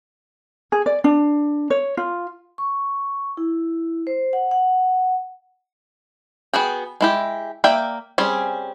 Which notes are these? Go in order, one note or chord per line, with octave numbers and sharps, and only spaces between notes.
G#4
D5
D4
C#5
F4
C#6
E4
C5
F#5
F#5
B3 F#4 G#4 G5
G#3 E4 G4
A#3 D5 E5 G5
G3 C4 C#4 G#4